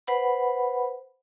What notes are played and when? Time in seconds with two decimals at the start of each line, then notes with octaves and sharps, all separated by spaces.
0.07 B4 C5 F#5 B5